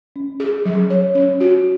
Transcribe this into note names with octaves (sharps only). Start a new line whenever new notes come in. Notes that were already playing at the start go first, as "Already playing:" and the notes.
C#4
G#4
F#3
C#5
C#4
F#4